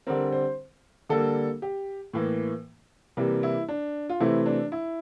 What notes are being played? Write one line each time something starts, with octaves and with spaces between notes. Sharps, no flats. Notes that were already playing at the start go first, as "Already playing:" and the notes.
D3 G3 C4 A#4
C5
D3 G3 A#3 A4
G4
A2 E3 A#3
C3 E3 G3 A#3
E4
D4
F4
C3 E3 A3 C4 E4
D4
E4